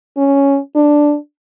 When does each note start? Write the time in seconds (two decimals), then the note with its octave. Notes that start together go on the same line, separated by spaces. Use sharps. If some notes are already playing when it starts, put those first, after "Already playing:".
0.17 C#4
0.75 D4